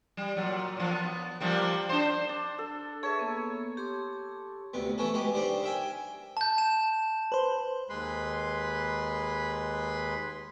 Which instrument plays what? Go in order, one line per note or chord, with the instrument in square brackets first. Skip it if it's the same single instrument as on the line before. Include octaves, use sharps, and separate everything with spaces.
[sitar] G3
A#2 F#3
A#2 F3
B3
F3 G3 A#3
D4 C5
[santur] D4
A4
[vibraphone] G#4 B4 E5 [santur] C#5 A5
[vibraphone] A#3 B3
G4 C6 D6
[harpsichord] D2 C3 B3
E3 A3 B3 C#4 A4
G#3 F#4 G4 B4
D3 G3 D#4 C5 D5
A#4 E5 G5 G#5
[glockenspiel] A5 G6
E7
[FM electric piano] B4 C5
[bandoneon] D#2 G#3 B4 B5 C6